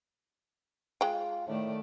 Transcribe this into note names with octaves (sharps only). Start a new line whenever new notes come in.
G#3 F4 G5
A2 D#3 A3 D5